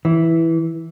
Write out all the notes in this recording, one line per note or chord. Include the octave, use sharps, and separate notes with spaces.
E3